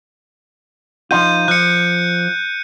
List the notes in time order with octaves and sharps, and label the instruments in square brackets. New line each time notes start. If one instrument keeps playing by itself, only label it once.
[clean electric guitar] F3 D#4 F4 [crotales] G6 D#7
[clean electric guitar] F3 [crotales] F#6 C#7